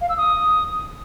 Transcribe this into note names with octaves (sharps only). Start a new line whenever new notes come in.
F5
E6
D#6